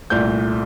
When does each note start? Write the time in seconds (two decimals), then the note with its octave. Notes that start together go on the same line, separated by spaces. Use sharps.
0.10 C2 A#2 A3 G6